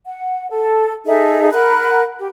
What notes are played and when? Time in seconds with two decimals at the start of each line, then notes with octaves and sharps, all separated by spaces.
0.06 F#5
0.50 A4
1.06 D#4 G#4 A4 E5
1.52 A#4 F#5 B5 F#6
2.18 G4